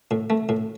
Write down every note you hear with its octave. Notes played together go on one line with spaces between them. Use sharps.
A2
A3
A2